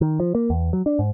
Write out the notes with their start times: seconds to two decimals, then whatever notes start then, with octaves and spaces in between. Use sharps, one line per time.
0.01 D#3
0.20 F3
0.35 A#3
0.50 E2
0.73 F#3
0.86 D4
0.99 G#2